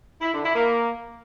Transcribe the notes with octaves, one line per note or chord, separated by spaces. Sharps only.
E4
D3
E4
A#3